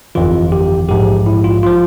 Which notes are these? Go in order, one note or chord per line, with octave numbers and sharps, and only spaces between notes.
G1 F2 E3 F4
G4
A#1 G#2 F3 G4
E4
F4
F3 F4